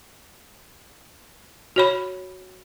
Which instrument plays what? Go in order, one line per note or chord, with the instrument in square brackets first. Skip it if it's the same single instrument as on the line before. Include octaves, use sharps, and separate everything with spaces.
[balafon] F#4 C#5 B5